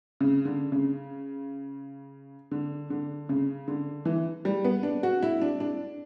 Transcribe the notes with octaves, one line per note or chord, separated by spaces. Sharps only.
C#3
D3
C#3
D3
D3
C#3
D3
E3
G3
B3
D4
F#4
E4
D4
D4